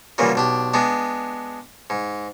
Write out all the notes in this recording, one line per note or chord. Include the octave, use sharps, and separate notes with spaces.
A#2 C#3 E3 F#3 G3
B1 D4 G4
G#3 B3 D4
G#2